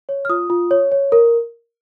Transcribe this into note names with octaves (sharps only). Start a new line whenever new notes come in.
C#5
F6
F4 D#6
F4
C#5
C#5
A#4